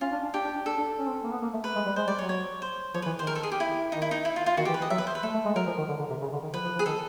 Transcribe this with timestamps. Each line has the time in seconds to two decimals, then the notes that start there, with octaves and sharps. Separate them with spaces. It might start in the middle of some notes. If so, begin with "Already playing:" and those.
0.01 C#4 F4
0.12 D4
0.23 D4
0.34 D4 G4
0.44 D4
0.55 D4
0.66 D4 A4
0.77 D4
0.99 C#4
1.07 C4
1.23 A#3
1.31 B3
1.42 A#3
1.53 A3
1.64 B4
1.75 G#3
1.86 G3
1.96 G#3 C5
2.07 G3 D5
2.18 F#3 C#5
2.29 C#5
2.62 C5
2.94 F3 C#5
3.02 B4
3.06 E3
3.17 D#3 C5
3.27 A#4
3.35 A4
3.43 G#4
3.52 G4
3.60 E4
3.92 D#3 D#4
4.02 E4
4.11 D#4
4.25 E4
4.36 F4
4.46 F4
4.57 D#3 F#4
4.65 G4
4.69 E3
4.74 B4
4.80 E3 D#5
4.90 F#3 E5
4.98 B4
5.07 C5
5.15 B4
5.23 A3 A4
5.34 A3
5.45 G#3
5.55 F#3 A#4
5.67 F3
5.78 D#3
5.88 D3
5.99 D3
6.10 C3
6.21 C#3
6.32 D3
6.43 D#3
6.53 F3 B4
6.64 F3
6.75 F3
6.79 G#4
6.86 D#3 A4